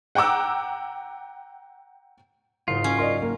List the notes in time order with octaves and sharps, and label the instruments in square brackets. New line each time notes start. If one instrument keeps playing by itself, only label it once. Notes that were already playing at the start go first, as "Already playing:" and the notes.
[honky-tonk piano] F#5 G5 A#5 D6 E6
[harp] F#1 G#2 C#7 [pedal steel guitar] F4
[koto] C#4
[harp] A#4 [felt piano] D5 D#5 C6
[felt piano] A#3